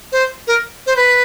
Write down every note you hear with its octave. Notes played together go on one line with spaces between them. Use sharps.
C5
A#4
C5
B4